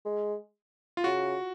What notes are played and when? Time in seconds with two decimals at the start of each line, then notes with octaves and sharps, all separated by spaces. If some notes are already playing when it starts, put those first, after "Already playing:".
0.05 G#3
0.97 F4
1.04 C#3 F#4